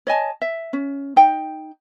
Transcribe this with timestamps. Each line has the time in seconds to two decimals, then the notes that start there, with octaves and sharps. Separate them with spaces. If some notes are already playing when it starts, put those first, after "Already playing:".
0.07 C#5 D#5 G#5 A5
0.42 E5
0.73 C#4
1.16 D#4 G5